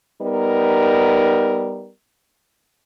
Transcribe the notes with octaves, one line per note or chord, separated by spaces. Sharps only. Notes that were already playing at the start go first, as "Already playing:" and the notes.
G3 B3 D#4 A#4